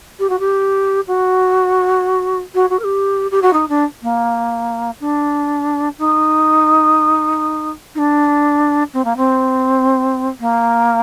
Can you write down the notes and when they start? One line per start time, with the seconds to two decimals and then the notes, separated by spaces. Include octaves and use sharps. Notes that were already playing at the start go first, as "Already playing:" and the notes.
0.19 G4
0.30 F#4
0.39 G4
1.07 F#4
2.55 F#4
2.70 F#4
2.79 A#4
2.84 G4
3.31 G4
3.42 F#4
3.53 D#4
3.69 D4
4.03 A#3
5.00 D4
5.99 D#4
7.95 D#4
7.98 D4
8.93 C4
9.05 A#3
9.17 C4
10.40 A#3